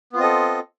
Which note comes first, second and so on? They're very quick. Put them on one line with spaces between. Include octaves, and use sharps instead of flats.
B3 F4 C4 D#5 A4